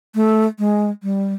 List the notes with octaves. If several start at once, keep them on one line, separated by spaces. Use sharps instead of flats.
A3
G#3
G3